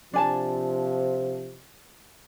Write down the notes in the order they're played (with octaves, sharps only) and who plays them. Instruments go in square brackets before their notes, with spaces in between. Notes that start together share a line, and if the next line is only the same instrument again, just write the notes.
[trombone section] C3 F3 [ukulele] D4 G#5 A5